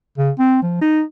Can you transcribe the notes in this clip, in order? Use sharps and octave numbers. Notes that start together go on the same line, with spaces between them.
C#3
C4
F3
D#4